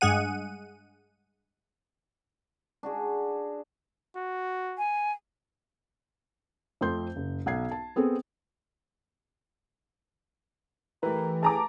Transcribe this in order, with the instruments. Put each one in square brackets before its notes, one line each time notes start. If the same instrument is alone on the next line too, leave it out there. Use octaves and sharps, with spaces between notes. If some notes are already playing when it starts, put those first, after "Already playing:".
[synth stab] G2 G#3 G#4 F#5 D#7
[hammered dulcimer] D4 F#4 G#4
[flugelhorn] F#4
[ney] G#5
[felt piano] F2 A3 C4 C6 G6
F#1
B1 F#5 G#6 C7
A5
B3 C4 G#4 A4
[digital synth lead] E3 [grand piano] A3 G4 B4 [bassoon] A#4
[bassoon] G#4 [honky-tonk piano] A5 A#5 D6